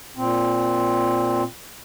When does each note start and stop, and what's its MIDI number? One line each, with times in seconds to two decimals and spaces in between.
0.17 1.43 46
0.17 1.43 60